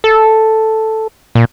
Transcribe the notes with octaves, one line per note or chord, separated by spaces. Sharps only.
A4
A#2